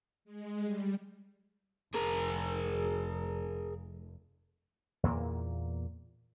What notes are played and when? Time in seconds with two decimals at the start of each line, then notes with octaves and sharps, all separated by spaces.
0.25 G#3
0.64 G3
1.94 F1 G#4 A#4
5.03 E2 A#2 A#3